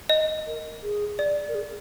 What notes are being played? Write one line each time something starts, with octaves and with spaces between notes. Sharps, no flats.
D#5
A#4
G#4
D5
A#4
G#4